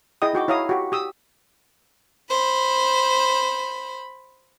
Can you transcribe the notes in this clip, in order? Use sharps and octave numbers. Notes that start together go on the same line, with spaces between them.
E4 G#4 D#5 G5 D#6
D#4 F#4 G5 D6
E4 C#5 F5 A#5 D#6
F#4 G4
G4 D#6 E6
C5 B5